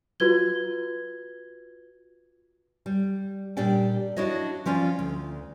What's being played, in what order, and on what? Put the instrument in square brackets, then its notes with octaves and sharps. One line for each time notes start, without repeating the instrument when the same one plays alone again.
[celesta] F4 F#4 B4 G#6 G7
[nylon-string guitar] G3
A#2 G3 D4 G4 D5 G5
D4 E4 F#4 C#5 D#5
F3 C#4 F4 D5
D2